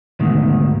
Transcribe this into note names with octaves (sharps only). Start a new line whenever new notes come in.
D2 G#2 B2 D#3